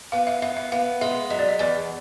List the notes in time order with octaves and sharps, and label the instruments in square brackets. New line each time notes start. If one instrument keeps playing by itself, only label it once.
[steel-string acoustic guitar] B3 [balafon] F5
[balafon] E5
[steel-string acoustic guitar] B3 [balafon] E5
[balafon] E5
[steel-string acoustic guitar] B3 [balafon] F5
[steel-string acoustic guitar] G#3 [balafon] E5
[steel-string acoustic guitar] F#3 [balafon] D#5
[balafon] D5
D#5
[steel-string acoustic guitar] E2 [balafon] D5